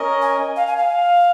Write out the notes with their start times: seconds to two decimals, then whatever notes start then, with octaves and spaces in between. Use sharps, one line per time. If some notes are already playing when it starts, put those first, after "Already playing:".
Already playing: C#4 A#4 D#5
0.22 G#5
0.56 F5
0.67 G#5
0.77 F5